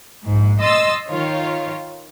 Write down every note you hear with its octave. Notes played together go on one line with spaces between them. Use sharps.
A#1 G#2
D#5 C6 E6 A6
D#3 F4 C#5